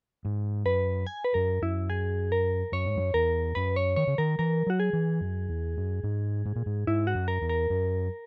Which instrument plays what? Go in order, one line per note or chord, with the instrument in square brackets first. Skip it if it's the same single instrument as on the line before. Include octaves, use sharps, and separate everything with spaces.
[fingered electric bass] G#2
[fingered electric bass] F#2 [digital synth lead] B4
[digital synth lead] G#5
B4
[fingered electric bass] F#2 [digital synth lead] A#4
[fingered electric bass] F#2 [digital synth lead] E4
[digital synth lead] G#4
A#4
[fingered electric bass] F#2 [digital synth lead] C#5
[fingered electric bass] G#2
F#2
[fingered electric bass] E2 [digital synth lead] A#4
[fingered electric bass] F#2 [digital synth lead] B4
[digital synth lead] C#5
[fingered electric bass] D#3 [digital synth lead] C#5
[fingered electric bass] C#3
[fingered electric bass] D#3 [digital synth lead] A#4
[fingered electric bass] E3 [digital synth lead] A#4
[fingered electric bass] F#3 [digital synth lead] F#4
[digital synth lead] G#4
[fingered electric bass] E3
F#2
E2
F#2
G#2
G#2
A#2
G#2
[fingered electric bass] G#2 [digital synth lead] E4
[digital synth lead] F#4
[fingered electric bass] F#2
[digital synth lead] A#4
[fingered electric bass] E2
[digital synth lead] A#4
[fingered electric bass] F#2